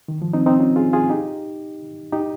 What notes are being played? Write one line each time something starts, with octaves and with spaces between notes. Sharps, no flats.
D#3
F3
C4 D#4
C4 D#4
C#4 F4
F4 G#4
F4 G#4
D#4 G4
D#4 G4